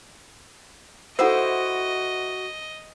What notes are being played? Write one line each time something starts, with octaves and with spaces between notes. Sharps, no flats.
D#4 E4 F#4 A4 C5 D#5 F#5 E6